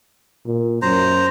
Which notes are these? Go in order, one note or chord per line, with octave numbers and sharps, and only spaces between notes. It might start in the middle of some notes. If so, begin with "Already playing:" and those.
A#2
F#2 C5 A#5